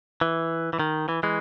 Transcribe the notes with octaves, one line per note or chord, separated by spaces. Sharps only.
E3
E3
D#3
E3
E3 G#3